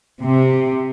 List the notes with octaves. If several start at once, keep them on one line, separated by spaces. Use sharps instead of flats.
C3